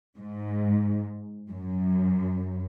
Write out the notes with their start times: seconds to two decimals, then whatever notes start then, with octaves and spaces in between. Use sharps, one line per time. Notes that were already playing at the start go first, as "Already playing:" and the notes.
0.17 G#2
1.50 F#2